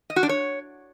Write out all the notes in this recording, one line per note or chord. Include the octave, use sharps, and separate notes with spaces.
D#5
F#4
D4
C#5